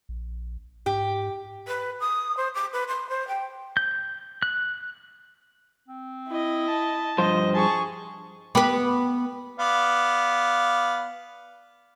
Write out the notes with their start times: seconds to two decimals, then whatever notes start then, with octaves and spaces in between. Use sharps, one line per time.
0.09 A#1
0.86 G#2 G4
1.68 B4
2.00 D#6
2.37 C5
2.55 D6
2.73 B4
2.88 C6
3.09 C5
3.28 G5
3.77 G6
4.42 F#6
5.88 C4
6.28 E4 D#5
6.68 A5
7.18 G2 F3 C5 D#5
7.54 G#4 A5 C#6
8.55 B3 B4 G5 B5 D6
9.59 B3 D5 F5